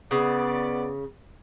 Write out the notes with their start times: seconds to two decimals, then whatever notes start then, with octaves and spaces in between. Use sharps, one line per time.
0.11 C#3 B3 D5